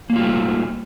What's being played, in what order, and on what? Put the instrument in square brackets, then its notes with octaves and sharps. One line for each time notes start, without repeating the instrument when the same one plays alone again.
[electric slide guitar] A#3
F#3
F4
G3
A3